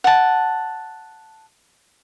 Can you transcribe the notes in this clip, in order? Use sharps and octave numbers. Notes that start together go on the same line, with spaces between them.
F#5 A5